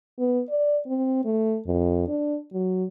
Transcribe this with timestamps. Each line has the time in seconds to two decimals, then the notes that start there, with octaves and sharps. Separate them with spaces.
0.19 B3
0.49 D5
0.86 C4
1.25 A3
1.67 F2
2.08 D4
2.53 F#3